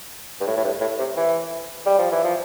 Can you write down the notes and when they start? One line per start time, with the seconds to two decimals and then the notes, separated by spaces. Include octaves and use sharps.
0.40 G2
0.47 A2
0.57 A2
0.64 G2
0.81 A2
0.98 C3
1.17 E3
1.86 G3
1.99 F3
2.11 E3
2.24 F3